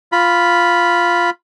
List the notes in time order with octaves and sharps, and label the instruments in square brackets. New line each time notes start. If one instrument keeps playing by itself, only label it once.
[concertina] F4 B5